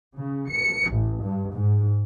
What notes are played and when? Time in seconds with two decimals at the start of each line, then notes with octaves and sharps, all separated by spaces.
0.17 C#3
0.50 C#7
0.91 A1
1.23 G2
1.53 G#2